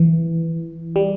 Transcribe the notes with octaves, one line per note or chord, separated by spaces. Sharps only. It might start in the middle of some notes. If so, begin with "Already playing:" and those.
Already playing: E3
G3